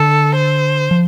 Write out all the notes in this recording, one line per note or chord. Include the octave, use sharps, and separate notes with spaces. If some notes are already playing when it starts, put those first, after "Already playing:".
Already playing: D3 A4
C5
F3